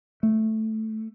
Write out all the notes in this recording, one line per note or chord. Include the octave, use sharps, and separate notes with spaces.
A3